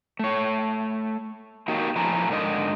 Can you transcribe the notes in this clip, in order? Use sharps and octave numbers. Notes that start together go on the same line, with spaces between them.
A3 C#5
A#3 D#4 F#4 G4 A#4
A2 F3 A3 E4 G#5 A#5
G#2 D3 A#4 D#5